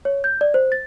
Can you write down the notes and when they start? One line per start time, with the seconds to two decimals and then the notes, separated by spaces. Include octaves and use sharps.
0.05 C#5
0.24 G6
0.41 D5
0.54 C5
0.72 A6